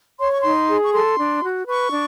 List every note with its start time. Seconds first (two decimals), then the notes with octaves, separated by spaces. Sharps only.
0.19 C#5 C6
0.30 C#6
0.41 D#4 C6
0.68 G#4
0.81 C#6
0.92 A4 C6
1.18 D4
1.43 F#4
1.67 B4 C#6
1.92 D4